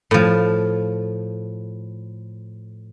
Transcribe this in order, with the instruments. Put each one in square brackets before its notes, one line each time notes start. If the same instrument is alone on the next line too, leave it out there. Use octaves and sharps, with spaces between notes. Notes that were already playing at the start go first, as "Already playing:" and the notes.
[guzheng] A2 F3